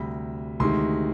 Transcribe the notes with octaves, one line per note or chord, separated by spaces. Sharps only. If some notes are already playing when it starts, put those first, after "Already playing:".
Already playing: D2 C3 G3 B5
D2 C3 D#3 G#3 C6